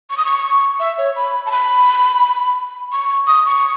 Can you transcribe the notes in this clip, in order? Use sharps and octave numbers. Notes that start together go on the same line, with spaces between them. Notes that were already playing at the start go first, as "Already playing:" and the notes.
C#6
D#6
C#6
E5
C#5
B5
A5
B5
C#6
D#6
C#6